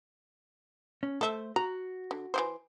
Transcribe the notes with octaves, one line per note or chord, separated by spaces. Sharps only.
C#4
A3 A4 C5 E5
F#4 A#5
D3
E3 A3 C5